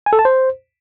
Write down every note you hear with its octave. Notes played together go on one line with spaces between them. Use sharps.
G#5
A4
A5
C5